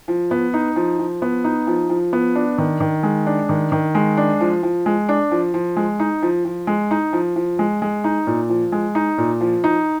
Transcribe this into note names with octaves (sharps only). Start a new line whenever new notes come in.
F3
B3
D#4
F3
F3
B3
D#4
F3
F3
B3
D4
D#3
D#3
G#3
D4
D#3
D#3
G#3
D4
F3
F3
G#3
D4
F3
F3
G#3
D#4
F3
F3
G#3
D#4
F3
F3
G#3
G#3
D#4
A#2
F3
G#3
D#4
A#2
F3
D#4